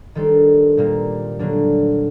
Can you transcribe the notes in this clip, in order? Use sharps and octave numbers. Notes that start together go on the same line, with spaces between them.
D#3 G3 D4 A4 C5
A#2 G3 A#3
D3 F#3 A#3 D4